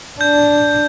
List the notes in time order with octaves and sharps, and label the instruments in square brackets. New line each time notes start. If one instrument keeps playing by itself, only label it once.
[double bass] D4 [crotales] G6